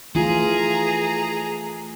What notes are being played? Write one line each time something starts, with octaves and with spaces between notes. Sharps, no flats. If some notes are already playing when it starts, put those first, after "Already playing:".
E3 A3 F4 G#4 A#5